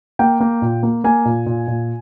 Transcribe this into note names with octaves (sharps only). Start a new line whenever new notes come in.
A#3 G5
A#3
A#2
A#3
A#3 G#5
A#2
A#2
A#2